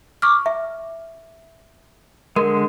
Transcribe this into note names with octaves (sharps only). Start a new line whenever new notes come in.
C#6 D6 F6
E5
D3 G#3 A#4